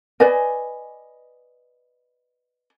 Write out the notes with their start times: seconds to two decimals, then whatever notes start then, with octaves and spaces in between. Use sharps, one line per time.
0.20 B4 D5 D#5 G#5